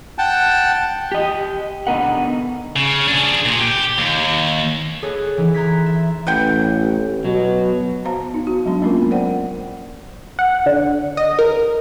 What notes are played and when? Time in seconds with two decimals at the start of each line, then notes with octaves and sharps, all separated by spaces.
0.18 F#5 G5 A5
1.12 G4 D#5
1.87 B2 D3 B3 D#4 A#4 F#5
2.76 C#3
3.08 D4 G#4
3.45 A#2
3.59 G4
3.98 D#2
5.02 G#4 A4 B4 C#5
5.37 E3 D#4
5.54 A#5 C6 F#6 G#6 A6 B6
5.86 E5
6.27 A1 B4 F#5 G5
7.25 B2 F#3
8.05 B3 F#4 C5 F5 A#5
8.34 D#4
8.47 F#4
8.66 F#3 G#3 B3 D4
8.82 F#3 A#3 C#4 F4 A#4
9.11 A#4 C5 D5 F#5 G5
10.39 F#5
10.66 D3
11.17 D#5
11.39 A#4